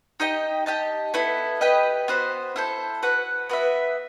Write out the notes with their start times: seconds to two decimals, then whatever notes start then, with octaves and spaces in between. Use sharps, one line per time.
0.20 D#4 G4 D#5 G5
0.66 G4 D#5 A5
1.14 B3 E4 A4
1.61 G4 B4 D#5 G5
2.08 B3 F#4 C5
2.56 E4 A4 C5
3.03 F#4 B4 F#5
3.50 B3 F#4 B4 E5